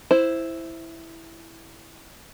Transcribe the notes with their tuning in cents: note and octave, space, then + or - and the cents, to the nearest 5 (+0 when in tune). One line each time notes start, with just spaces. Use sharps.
E4 +0 C5 +0